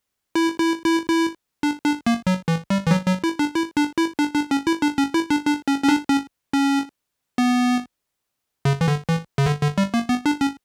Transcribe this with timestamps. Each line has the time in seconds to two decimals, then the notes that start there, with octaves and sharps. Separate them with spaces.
0.35 E4
0.60 E4
0.85 E4
1.09 E4
1.63 D4
1.85 D4
2.06 A#3
2.27 F#3
2.48 E3
2.70 G3
2.87 E3
2.91 F#3
3.07 F#3
3.24 E4
3.39 D4
3.55 E4
3.77 D4
3.98 E4
4.19 D4
4.35 D4
4.51 C#4
4.67 E4
4.82 D4
4.98 C#4
5.14 E4
5.30 D4
5.46 D4
5.68 C#4
5.84 C#4
5.89 D4
6.10 C#4
6.53 C#4
7.38 B3
8.65 C#3
8.81 E3
8.88 D3
9.08 E3
9.38 C#3
9.46 D3
9.62 D3
9.78 G3
9.94 A#3
10.09 B3
10.26 D4
10.41 C#4